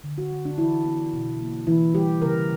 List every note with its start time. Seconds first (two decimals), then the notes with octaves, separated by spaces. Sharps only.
0.04 D3
0.18 F#4
0.31 F#3
0.45 D4
0.58 E3 E4
0.85 B3
1.14 B2
1.40 A#3
1.67 E3 E4
1.95 G3 G4
2.22 C#3 A#4